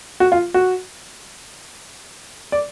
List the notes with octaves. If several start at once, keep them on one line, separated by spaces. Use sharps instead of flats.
F#4
F4
F#4
D5